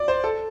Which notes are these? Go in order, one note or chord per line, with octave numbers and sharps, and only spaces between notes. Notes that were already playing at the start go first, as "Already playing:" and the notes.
Already playing: D5
C5
A4